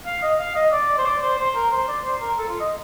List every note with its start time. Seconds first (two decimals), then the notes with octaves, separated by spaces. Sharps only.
0.05 F5
0.22 D#5
0.39 F5
0.55 D#5
0.72 D5
0.98 C5
1.05 D5
1.22 C5
1.38 C5
1.55 A#4
1.71 C5
1.88 D5
2.04 C5
2.22 A#4
2.38 A4
2.48 F4
2.60 D#5